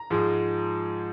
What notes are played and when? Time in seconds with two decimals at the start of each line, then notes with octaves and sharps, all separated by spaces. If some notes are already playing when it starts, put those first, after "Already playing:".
Already playing: A#5
0.10 G#2 F3 G#3